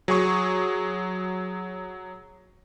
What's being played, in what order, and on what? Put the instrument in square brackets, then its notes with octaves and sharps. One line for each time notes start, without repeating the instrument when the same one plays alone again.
[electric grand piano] F#3 G#4 C#6